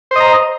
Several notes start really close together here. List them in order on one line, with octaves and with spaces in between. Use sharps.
C5 D#5 A#5